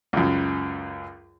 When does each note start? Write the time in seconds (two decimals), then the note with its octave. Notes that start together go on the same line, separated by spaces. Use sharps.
0.13 C#2 F#2